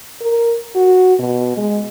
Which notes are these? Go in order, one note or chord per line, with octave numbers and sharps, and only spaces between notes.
A#4
F#4
B2
G#3